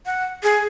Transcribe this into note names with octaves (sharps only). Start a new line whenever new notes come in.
F#5
G#4